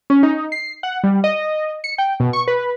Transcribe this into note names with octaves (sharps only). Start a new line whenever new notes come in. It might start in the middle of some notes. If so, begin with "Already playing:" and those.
C#4
D#4
C7
F#5
G3
D#5
C#7
G5
B2
C#6
B4